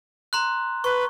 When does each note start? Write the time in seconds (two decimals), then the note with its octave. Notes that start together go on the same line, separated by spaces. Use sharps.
0.33 A#5 C6 F#6
0.84 B4 C#6